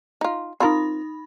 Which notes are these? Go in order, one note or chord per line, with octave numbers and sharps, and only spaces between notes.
D#4 F4
C4 D#4 F4 A#4 B5